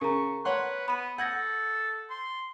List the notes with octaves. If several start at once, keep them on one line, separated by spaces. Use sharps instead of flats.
C#3 A#4 A#5 C#6
B4 C#5 F#5 C6
B3 B5 D#7
A4 F#5 G6 G#6 A#6
C6